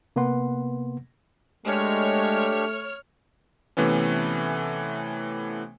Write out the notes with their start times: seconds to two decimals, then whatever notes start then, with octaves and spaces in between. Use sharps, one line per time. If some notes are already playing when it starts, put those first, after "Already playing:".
0.16 C3 A#3 B3 B4 F#5 C6
1.66 G#3 A3 D4 G4 C#5 F6
3.77 C3 E3 A3 B3 C#4